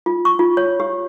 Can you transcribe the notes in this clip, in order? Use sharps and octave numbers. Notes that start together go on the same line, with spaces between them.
F4
C#6
F4
C#5
G4